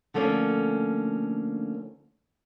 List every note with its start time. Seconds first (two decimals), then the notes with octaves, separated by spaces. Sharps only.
0.14 D3 F3 A3 A#3 C#4